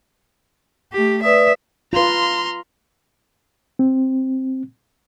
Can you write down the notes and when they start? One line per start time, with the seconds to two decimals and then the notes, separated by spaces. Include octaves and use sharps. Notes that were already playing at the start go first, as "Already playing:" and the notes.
0.93 A3 G4
1.23 B4 D5 E5 D#6
1.93 F4 B4 A#5 C6
3.79 C4